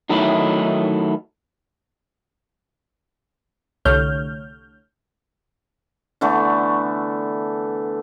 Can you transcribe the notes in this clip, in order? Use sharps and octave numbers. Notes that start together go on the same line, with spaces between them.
D#3 F#3 A3 D#4 E4
C2 D3 A3 C#5 F6 G6
D3 E3 A3 B3